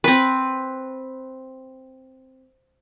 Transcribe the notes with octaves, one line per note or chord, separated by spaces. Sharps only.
C4 B4